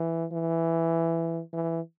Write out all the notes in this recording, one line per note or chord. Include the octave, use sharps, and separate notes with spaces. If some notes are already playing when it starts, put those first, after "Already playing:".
Already playing: E3
E3
E3